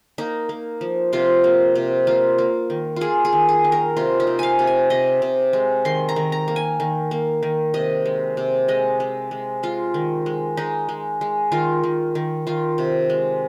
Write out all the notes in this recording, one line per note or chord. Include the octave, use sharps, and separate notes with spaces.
A#3 D#4
A#3
F3
C3 F4
A#3
C3
A#3 F4
A#3
D#3
A#3 F4 G#4
G#4
D#3
G#4
D#3
A#4
C3 F4
D#4
C3
F5 G#5
C3
G#5
C3 D#5
C3
G#3
D#3 C6
A#5
D#3
A#5
A#3
G#5
D#3
A#3
D#3
C3 D#5
G#3
C3
G#3 D#5
G#3
G#3
G#3 F4
D#3
G#3
G#3 D#4
G#3
G#3
D#3 F4
D#3
D#3
D#3 F4
C3
G#3